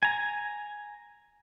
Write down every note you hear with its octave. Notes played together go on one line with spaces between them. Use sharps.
G#5 A#5